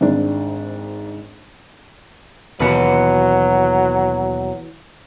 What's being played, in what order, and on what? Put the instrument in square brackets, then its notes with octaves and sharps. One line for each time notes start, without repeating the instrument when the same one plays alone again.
[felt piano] G#1 G#2 D4
[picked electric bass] D#2 B2 [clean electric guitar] E3 F#4 B4 [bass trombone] F#3